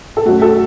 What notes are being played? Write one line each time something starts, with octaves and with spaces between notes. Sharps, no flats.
A4
F#2 F#3 A3 F#4
A4